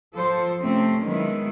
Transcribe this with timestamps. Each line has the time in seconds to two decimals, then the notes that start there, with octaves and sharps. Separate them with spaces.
0.13 F3 A4 C5
0.61 C3 A3 C4 C#4
1.03 D#3 F#3 G#3 B3 E4